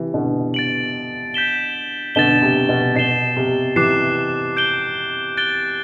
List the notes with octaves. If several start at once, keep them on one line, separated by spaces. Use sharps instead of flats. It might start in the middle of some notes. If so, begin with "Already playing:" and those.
Already playing: C3 E3
B2 D3
A6 D7 F#7
G6 B6 E7 G7
B2 D3 A6 E7 G7
C3
B2
B2 A6 C7 E7 G7
C3
C3 E3 D6 F#6 C7 E7
G6 D7 G7
F#6 A6 D7 G7